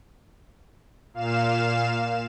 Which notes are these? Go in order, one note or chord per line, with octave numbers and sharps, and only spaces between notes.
A#2 F5 E7